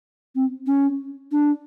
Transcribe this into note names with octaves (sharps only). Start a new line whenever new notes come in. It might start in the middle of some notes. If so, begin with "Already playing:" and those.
C4
C#4
D4